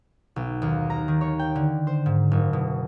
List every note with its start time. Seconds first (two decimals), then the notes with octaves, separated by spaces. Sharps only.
0.36 B1
0.62 D#2
0.90 A#5
1.08 D#3
1.21 C#5
1.39 G5
1.55 D3
1.87 C5
2.06 G#2
2.32 F#1
2.53 B2